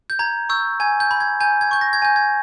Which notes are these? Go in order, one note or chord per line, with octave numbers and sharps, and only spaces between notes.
G6
A#5 G#6
C#6 E6 G6
G#5 G#6
G6
B5 G6
G#6
G#5 G6
G#6
C#6 G6
A#6
G#6
G#5 G6
G#6